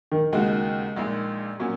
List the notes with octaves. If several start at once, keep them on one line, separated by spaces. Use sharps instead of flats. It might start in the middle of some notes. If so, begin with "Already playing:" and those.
D#3
D#2 C#3 G#3 A#3 D#4 F#4
A#1 A#2 G#3 D#4
A#2 F#3 C#4